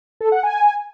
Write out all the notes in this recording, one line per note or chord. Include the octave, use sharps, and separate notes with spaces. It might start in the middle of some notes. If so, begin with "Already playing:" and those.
A4
F#5
G#5